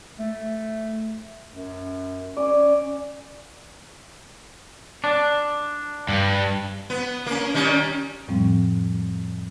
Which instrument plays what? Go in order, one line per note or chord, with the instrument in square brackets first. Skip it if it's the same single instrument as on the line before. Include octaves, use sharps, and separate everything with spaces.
[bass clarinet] A3
F#2
[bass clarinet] C#4 [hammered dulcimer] D5
[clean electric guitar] D4
[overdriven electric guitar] G2
[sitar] B3
A#3 C#4
D#3 G3 C#4
[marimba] F2 A2 F3 G3 C4